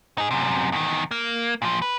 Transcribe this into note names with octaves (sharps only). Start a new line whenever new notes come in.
D#4 G#4
F#2 C3
E2 D#3
A#3
A#2 F3
B4